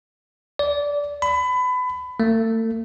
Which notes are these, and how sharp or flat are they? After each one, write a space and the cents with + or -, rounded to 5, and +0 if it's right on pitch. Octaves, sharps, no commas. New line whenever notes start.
D5 -20
B5 +25
A3 +40